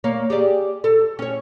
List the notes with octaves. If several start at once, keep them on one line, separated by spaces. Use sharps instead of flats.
A#3 C#5
G4 G#4 D5
A4
C#4 C#5